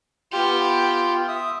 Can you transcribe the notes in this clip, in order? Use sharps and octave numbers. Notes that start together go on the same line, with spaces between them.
B3 F4 G4
E5 D#6